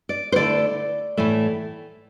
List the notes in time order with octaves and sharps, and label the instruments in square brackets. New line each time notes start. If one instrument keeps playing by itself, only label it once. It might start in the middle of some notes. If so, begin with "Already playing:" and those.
[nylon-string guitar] D5
C5
D3 A3 E4 D5
A2 E3 A3